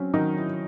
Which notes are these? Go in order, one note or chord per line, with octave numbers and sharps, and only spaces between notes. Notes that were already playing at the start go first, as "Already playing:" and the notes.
Already playing: F#3 C4 C#4
D#3 F#3 D#4
E4